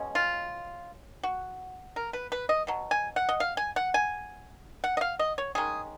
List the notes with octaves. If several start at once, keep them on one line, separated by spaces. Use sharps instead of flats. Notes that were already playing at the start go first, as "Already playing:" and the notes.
Already playing: B2 G#3 C#4
F4
F#4
A#4
B4
B4
D#5
B2 F#3
G#5
F#5
D#5
F5
G#5
F#5
G#5
F#5
D#5
F5
D#5
C#5
D#3 G#3 C#4 G#4